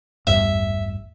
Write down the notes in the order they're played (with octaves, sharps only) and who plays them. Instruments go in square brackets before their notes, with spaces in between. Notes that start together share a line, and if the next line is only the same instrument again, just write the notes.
[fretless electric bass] A1 E2 G2 [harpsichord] E5